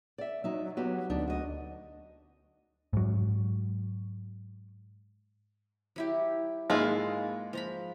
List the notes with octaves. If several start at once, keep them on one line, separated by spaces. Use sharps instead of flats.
D5 E5
F#3 D#4 E5
B3 F#4 G4
D2 D4 D#4
F#4 D#5
G#2 F#3
F#3 E4 G4
G#2 G#3 A#3 E4 F4
F3 A#5 B5